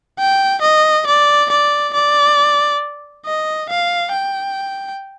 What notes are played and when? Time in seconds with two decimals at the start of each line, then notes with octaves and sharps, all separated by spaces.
0.19 G5
0.62 D#5
1.07 D5
1.50 D5
1.94 D5
3.26 D#5
3.70 F5
4.12 G5